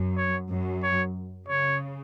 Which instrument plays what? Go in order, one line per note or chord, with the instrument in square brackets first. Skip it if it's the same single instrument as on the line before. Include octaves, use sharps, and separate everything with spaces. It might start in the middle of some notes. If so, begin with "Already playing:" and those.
Already playing: [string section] F#2
[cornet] C#5
[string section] F#2
[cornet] C#5
[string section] C#3 [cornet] C#5